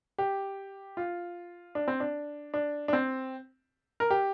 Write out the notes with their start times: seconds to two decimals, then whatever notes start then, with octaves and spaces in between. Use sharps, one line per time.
0.18 G4
0.97 F4
1.75 D4
1.88 C4
2.00 D4
2.54 D4
2.88 D4
2.93 C4
4.00 A#4
4.10 G4